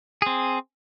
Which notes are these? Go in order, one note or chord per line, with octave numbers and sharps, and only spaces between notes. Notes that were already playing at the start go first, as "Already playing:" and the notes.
C4 G#4